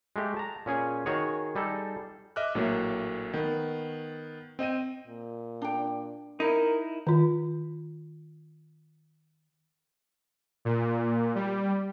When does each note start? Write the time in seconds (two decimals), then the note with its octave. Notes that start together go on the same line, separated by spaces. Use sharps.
0.16 G#3 A3 G4
0.37 A5 A#5
0.66 A#2 C#4 G#4 G#5
1.06 D#3 F#4 G#4 C#5
1.55 G3 D#4 G#4 A4
2.36 D#5 E5 D6 F6 F#6
2.55 A#1 A2 F#3 A3 A#3
3.33 D#3 B3
4.59 C4 D#5 G5 D#7
5.07 A#2
5.62 D4 G5
6.40 D#4 E4 A#4
7.07 D#3 F4
10.65 A#2
11.35 G3